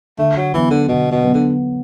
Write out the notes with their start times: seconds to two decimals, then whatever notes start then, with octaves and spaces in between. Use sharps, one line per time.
0.18 D3 A3
0.37 F#3
0.53 E3 F#3 B3
0.70 D3
0.88 B2 D3
1.11 B2
1.23 F#3 B3
1.34 D3